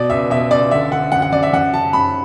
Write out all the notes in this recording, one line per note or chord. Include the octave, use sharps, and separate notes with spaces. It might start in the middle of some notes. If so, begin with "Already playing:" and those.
Already playing: B2 D5
C#2 E5
B2 E5
C#2 D5
D3 E5
D3 F#5
F#2 F#5
F#5
F#2 D5
E5
F#2 F#5
C#3 A5
F#2 B5